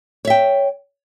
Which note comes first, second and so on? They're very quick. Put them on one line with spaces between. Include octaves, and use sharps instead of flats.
C#5 E5 G5